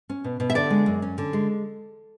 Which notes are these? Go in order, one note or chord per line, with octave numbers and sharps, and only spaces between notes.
C#4
B2
B2
E5
D3 D5
G#3
F#2
C#4
D3
G#3